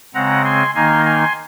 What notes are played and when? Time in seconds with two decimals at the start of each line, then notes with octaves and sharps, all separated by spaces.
0.14 C#3 G#3 C4 F#5 A#5
0.45 G#5 C6
0.75 D#3 A#3 D#4 G#5 C6
1.05 G#5 C6